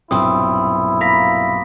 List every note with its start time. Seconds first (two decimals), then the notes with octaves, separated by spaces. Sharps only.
0.11 B1 G2 A#2 C4 E4 D#6
1.01 A#3 B5 A#6 B6